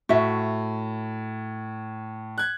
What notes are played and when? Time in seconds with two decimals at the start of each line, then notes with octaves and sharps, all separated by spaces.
0.09 A2 F#4 E5
2.38 F#6 G#6